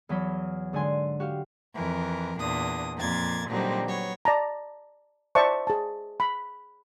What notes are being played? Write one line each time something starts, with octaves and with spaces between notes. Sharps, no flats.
E2 E3 F#3 B5
G#2 D3 D5 G#5 C6
F#4 G4 F5
F2 E3 A#4
E2 A#2 D4 D#6
F2 A#2 A#3 G#6 A6
A#2 D3 F#3 G3 C4 D#4
F#3 B3 C#5
D5 A5 A#5
C5 D5 E5 A5 C#6
G#4 A5
B5